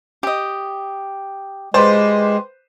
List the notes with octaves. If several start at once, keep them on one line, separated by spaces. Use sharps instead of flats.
G4 D#5
G#3 F4 G4 B4 C5 D5